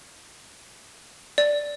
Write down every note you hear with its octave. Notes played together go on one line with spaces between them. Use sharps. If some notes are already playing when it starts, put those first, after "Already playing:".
D5